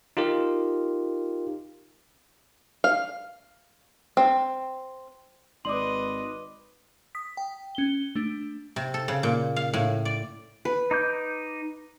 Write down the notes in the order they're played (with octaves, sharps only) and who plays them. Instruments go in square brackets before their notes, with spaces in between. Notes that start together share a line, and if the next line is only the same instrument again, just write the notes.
[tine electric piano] D#4 F4 G4 A#4
[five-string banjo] F5
C4
[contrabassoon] G#1 [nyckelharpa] B4 D#5 [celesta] D5 F#7 [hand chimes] C6 D6
[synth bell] D#6 B6
G5
C#4 G7
A3 D4
[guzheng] C3
A4
C#3
A#2
F5
A2
D5
[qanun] B4
[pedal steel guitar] D#4 D6 G6